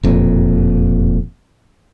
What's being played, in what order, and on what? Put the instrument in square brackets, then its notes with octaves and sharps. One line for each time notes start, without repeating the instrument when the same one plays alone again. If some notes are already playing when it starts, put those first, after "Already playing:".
[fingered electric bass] E1 F2 A#2